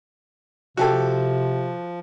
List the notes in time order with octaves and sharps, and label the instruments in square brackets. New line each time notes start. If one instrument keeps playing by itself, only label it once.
[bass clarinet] C3 [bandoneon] F3 [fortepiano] F#4 G4 A4